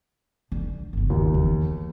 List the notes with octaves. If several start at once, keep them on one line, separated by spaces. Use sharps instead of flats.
D3
G1 C#2
D#2
E2